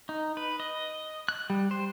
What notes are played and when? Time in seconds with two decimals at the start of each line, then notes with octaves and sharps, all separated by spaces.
0.09 D#4
0.37 B4
0.60 D#5
1.29 F#6
1.50 G3
1.71 C5